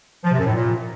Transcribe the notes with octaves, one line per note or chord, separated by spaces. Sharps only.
F3
C3
F#2
A2
A#2